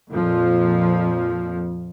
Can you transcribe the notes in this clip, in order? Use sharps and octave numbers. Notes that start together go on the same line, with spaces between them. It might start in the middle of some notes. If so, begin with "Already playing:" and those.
F2 A#2 F3